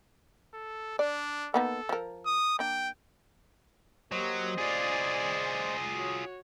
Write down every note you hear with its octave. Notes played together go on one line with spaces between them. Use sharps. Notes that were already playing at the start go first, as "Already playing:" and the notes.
A4
D4 D5
A#3 B3 D#4 A4
F3 A#4
D#6
A#3 D4 G5
F#3 A#3 G4 C5 D#5
F4 G#4 D5 G#5
F#4 C#5